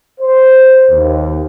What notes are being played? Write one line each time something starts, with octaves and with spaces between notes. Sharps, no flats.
C5
D#2